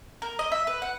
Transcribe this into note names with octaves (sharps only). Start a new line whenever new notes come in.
A#4
D#5
E5
B4
F#5